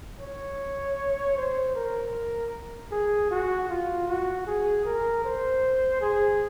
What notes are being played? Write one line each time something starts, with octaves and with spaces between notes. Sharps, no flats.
C#5
C5
A#4
G#4
F#4
F4
F#4
G#4
A#4
C5
G#4